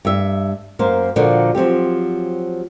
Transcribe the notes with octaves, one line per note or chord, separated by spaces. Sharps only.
G2 E5
F#2 A#3 C5 F5
A#2 D3 F3 A#3 F#4
F3 F#3 C4 G4